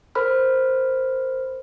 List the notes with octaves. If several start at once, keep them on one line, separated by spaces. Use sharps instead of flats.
A#4 C5 B5 F6